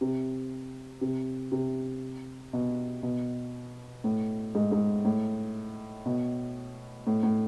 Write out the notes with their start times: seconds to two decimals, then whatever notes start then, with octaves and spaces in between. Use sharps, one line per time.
0.01 C3
1.01 C3
1.52 C3
2.53 B2
3.03 B2
4.04 A2
4.55 G#2
4.72 G#2
5.05 A2
6.05 B2
7.07 A2
7.23 A2